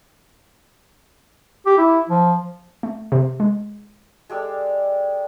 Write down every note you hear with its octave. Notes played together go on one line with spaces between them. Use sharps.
G4
E4
F3
A3
C3
G#3
G#3 G4 A4 D5